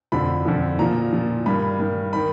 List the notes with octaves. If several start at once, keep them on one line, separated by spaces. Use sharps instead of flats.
F2 D3 F3 B5
F2 D3 F3
A#2 F3 A#5
A#2 F3
G2 D#3 B5
G2 D#3
D#3 B5